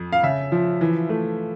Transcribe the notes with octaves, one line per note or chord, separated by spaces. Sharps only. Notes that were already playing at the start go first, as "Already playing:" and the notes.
Already playing: F2
F5
C#3 E5
F3
E3
A3